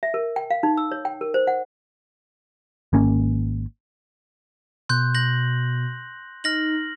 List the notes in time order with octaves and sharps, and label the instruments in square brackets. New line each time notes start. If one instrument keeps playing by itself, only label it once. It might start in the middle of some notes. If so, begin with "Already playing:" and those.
[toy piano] E5
A#4
G5
F5
D#4
E6
C#5
G5
A#4
C5
F#5
[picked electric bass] G#1 A#3 C#4
[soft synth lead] B2 [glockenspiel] C6 F#6 G6
[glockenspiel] G6 A#6 F#7
[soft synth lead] D#4 [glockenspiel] F6 A#6 F#7